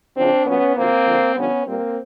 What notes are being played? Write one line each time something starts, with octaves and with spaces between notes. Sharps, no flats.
E2 C#3 F3 C4 D4
A#2 F#3 B3 C#4
D2 C3 F3 A#3 C4
F2 D3 F3
G2 D3 F3 B3 C#4
A#2 G3 A#3 C4